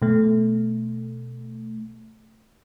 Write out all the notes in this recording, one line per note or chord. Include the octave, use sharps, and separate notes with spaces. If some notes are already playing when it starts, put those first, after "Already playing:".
B2 A3